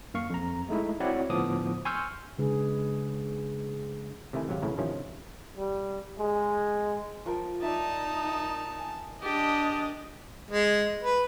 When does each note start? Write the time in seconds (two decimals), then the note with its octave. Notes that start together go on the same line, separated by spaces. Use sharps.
0.14 F#2 A#3 F5 C#6
0.30 F2 A#5
0.69 G#3 A3 D#4 E4
1.00 C4 E4 F#4 C#5 D5 F#5
1.30 A2 D3 F3 B3 D6 D#6
1.85 G#5 C6 C#6 E6 F6 G6
2.38 C#3 G#3 D4 G#4 B4
4.33 C3 D#3 A3 E4 G#5
4.49 G#1 C3 F#3 G4 F5
4.62 A1 A2 C#3 E4 A#5
4.78 G2 C3 D#3 F3 C#4 E4
5.57 G3
6.19 G#3
7.26 F3 A#4 G5
7.62 D#4 D5 E5 A5
8.25 G5
8.79 G#5
9.23 D4 G4 D#5 A5
10.51 G#3
11.02 B4